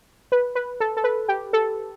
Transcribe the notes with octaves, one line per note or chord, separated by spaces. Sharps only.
B4
B4
A4
A4
B4
G4
A4